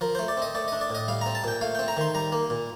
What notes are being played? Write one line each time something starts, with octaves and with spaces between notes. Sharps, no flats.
F3 A#4
A3 C5
D5
C4 D#5
A3 D5
D4 D#5
D5
A2 D#5
G3 F5
C4 A#5
A5
A#2 G5
A3 F5
C4 G5
A#5
D#3 C6
G3 A#5
A#3
A#2